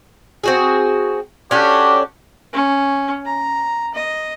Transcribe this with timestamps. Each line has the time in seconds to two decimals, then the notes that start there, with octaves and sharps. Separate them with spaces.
0.44 C4 F#4 G#4
1.51 C#4 D4 F#4 G4 A4
2.53 C#4
3.26 A#5
3.94 D#5